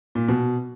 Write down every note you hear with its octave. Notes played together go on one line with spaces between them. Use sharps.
A#2
B2